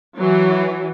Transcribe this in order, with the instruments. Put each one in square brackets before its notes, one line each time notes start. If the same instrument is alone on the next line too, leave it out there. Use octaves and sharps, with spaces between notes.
[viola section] E3 F#3